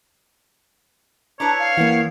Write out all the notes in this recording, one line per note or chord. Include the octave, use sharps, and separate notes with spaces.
D4 E4 B4 C#5 A#5
F5
F#2 E3 A#3 E4 F#5